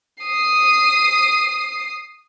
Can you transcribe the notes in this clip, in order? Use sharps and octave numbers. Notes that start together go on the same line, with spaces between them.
D#6 C7